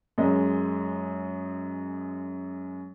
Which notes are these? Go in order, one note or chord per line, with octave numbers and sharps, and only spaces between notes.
F#2 G#3 D#5